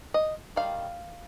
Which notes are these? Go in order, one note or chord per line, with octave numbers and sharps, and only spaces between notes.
D#5
D#3 G3 F5